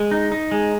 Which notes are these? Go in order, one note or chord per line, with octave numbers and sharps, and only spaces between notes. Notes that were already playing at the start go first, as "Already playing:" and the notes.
Already playing: G#3
D#4
D#4
G#3